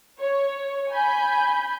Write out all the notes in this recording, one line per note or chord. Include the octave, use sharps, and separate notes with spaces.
C#5
G#5 B5 G6